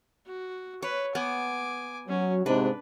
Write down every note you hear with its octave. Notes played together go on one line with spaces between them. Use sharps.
F#4
B4 C#5
B3 G#5 D6
F#3 C#4
G#2 C3 D4 B4